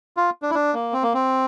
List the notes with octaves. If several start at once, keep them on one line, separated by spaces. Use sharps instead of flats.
F4
D4
E4
D4
A#3
C4
A#3
C4